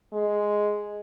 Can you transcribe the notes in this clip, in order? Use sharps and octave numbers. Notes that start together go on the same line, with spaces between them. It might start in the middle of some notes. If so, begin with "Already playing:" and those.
G#3